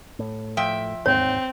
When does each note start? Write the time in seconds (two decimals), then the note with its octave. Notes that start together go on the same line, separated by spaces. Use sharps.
0.19 A2
0.57 F3 E5 G5
1.06 E1 D#2 G#2 C4 C#5